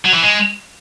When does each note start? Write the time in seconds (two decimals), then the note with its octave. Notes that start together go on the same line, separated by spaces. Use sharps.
0.05 F#3
0.14 E3
0.23 G#3